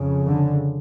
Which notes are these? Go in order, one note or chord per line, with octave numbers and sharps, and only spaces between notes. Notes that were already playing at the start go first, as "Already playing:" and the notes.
Already playing: F2 C#3
D3